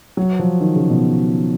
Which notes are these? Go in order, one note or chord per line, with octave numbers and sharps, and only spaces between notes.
F#3
F3
D#3
C#3
B2